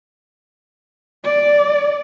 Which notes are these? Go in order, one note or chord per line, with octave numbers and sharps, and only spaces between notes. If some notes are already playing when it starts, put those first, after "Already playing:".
D5